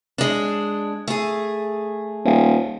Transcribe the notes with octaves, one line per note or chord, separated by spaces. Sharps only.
G#3 D4
A3 G#4
D#1